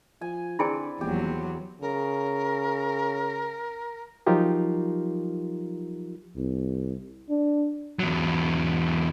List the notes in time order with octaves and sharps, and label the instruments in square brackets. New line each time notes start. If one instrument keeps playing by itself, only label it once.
[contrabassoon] F3 [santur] G#5
[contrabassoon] D3 [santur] C4 B4 D5 [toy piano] E4 G#4 G#5
[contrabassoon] D#1 [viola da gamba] E2 F#3 [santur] G4
[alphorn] C#3 [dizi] A#4
[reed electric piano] F3 F#3 D#4 F4 G4 A#4
[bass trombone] C2
D4
[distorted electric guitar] E2 F#3